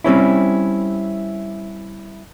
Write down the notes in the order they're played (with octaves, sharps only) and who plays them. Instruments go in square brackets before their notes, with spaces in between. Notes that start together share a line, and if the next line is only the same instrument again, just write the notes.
[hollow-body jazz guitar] G3 C4 C#4 E4